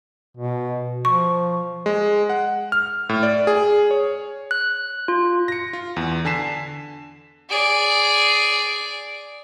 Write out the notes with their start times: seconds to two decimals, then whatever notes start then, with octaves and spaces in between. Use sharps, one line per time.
0.37 B2
1.05 F3 C#6
1.86 G#3
2.30 F#5
2.72 F6
3.09 A2
3.23 D5
3.47 G#4
3.91 C#5
4.51 F#6
5.08 F4
5.48 A#6 C#7
5.73 F4
5.96 E2
6.25 D3 G#5 A5 B6 C7 E7
7.49 G#4 D5